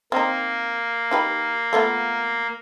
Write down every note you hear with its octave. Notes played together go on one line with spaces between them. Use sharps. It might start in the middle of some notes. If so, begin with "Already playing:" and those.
A#3 C4 D#4
D#4 G4 B4
A3 B3 F4